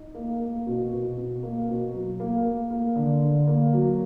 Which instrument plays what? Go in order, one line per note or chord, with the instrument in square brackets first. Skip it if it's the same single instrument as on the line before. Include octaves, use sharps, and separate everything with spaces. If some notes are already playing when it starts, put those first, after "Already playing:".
Already playing: [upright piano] D#4
A#3
A#3
B2
B2
B2
A#3
B2
F#3
A#3
A#3
A#3
D3
D3
A#3
F#3